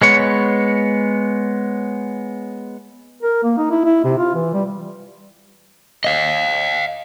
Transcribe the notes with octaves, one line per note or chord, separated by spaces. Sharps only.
G#3 B3 C#5
A#4
A#3
D#4
E4
E4
C3
F4
E3
G3
D#5 F5